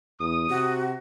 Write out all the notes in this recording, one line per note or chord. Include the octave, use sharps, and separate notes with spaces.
E2 D#6
C3 F#4